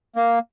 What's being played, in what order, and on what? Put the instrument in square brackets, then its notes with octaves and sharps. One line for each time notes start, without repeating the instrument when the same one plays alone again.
[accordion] A#3